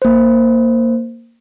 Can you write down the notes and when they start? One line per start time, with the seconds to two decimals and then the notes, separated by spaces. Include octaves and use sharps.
0.02 A#3 C5